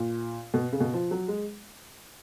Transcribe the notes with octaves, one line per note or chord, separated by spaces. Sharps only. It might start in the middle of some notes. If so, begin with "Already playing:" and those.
Already playing: A#2
B2
C#3
B2
F3
F#3
G#3